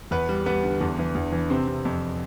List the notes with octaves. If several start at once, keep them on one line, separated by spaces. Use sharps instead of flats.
E2 B3 B4
G3
G3 B3 B4
D3
E2 D3 D4
E3
E2
E3
C3 C4
C3
F2